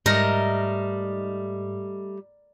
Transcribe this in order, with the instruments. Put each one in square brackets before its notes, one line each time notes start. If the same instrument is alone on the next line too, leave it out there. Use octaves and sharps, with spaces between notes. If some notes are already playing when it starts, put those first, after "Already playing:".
[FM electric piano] G#2 [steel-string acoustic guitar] G3 [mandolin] A3 D#5 [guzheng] A#4